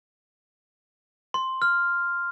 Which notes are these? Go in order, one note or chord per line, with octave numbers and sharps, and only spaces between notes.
C6
F6